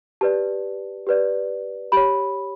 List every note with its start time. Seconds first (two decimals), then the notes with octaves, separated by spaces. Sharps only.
0.21 G4 B4 D5 A5
1.07 G4 B4 D5
1.92 G4 C#5 B5